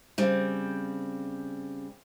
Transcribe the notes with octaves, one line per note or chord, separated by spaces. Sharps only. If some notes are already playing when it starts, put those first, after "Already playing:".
C#3 G3 C4